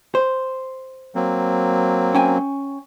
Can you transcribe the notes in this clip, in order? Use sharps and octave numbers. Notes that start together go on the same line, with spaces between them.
C5
F#3 A#3 C4
C#4 G5 G#5